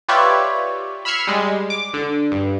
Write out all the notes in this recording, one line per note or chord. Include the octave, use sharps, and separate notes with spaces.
F4 G4 B4 C#5 D5 E5
B5 E6 F6 G#6 C7 C#7
G3 G#3
D6
D3
G2